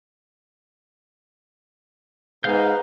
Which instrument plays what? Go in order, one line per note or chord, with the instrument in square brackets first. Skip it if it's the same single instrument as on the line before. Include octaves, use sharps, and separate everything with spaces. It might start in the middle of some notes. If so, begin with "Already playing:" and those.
[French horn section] G#2 [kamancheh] B3 A#5 [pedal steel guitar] F5 G6